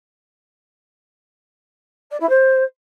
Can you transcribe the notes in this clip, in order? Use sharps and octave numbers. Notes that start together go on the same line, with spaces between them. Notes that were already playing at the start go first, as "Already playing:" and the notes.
D5
E4
C5